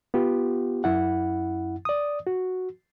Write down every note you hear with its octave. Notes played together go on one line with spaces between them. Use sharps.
B3 F4 G4
F#2 E4 F#5
D5 D#6
F#4